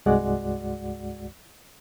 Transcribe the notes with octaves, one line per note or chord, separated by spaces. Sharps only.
C2 G2 G#3 F#4 D5 F#5